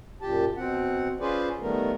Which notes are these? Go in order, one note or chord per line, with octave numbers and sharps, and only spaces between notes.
F#2 A#2 G4 A5
B2 C4 F#5
C#4 F4 G#4 B4 C5 D5
D#3 G3 A3 B3 A#4